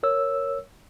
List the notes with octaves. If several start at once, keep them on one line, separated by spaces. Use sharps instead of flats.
A#4 C#5 E6